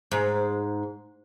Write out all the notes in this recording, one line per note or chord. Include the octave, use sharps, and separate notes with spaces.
G#2